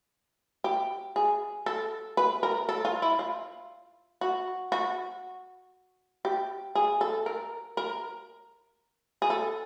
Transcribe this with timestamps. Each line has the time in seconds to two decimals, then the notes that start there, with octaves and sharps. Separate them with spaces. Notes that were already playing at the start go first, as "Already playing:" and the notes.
0.64 G4
1.16 G#4
1.66 A4
2.17 B4
2.43 A#4
2.69 A4
2.85 F4
3.02 E4
3.19 F4
4.21 F#4
4.72 F#4
6.25 G4
6.75 G#4
7.01 A4
7.26 A#4
7.77 A#4
9.22 G#4
9.30 A4